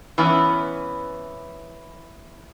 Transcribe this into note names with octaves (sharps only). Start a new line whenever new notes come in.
E3 B3 C#4